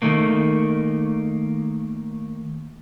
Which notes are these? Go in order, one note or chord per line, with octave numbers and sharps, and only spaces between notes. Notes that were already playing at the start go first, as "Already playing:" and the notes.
D#3 A3 A#3